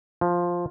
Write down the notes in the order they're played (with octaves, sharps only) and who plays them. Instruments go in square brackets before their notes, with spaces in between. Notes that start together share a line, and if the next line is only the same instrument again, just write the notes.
[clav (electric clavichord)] F3